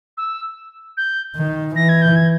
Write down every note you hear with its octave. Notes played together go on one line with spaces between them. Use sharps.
E6
G6
D#3
E3 A#6
G#6
G6
G#6